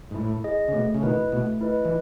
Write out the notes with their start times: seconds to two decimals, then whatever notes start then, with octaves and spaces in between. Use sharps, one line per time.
0.11 G#2
0.14 A2 E4
0.44 G#4 D#5
0.68 C#3
0.73 B2 A3
0.94 C#3
1.03 B2 D#3 E4 B4 D#5
1.32 B2 A3
1.61 E4 B4 D#5
1.85 E3